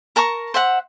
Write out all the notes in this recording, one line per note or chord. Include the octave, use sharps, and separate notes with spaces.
A#4 A5 A#5 C#6
C5 E5 F#5